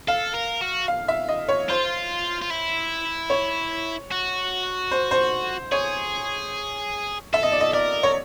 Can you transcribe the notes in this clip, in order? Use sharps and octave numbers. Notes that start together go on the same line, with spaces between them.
A4 F5
A#4
F#4
F5
E5
D#5
C#5
F4 C5
F4
E4
C#5
F#4
C5
C5
G#4 C#5
A4 E5
D#5
D5
D#5
A#4 D5
C#5